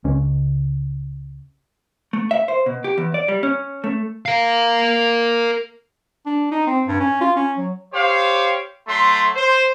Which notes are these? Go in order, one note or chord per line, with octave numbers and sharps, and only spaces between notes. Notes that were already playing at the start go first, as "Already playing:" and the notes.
C#2 C#4
A3
E5
C5
B2
G4
E2
D5
G3
C#4
A3
A#4 F5
D4
D#4
C4
G2
C#4
F4
C#4
F#3
G4 C5 C#5 F5
F#3 A3 C6
C5